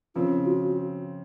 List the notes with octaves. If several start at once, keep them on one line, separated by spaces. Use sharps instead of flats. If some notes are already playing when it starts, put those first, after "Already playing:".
C#3 F3 C4 F4
F#4